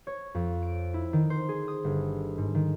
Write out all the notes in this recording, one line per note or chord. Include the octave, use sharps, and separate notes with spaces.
C#5
F2
D7
E4
D#3
C5
G#4
D#6
G1
G#2
D#3